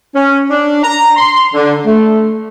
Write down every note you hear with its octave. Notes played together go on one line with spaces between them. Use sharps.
C#4
D4
A#5
C6
D3
A3